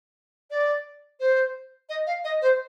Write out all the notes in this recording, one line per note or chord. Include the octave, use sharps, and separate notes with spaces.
D5
C5
D#5
F5
D#5
C5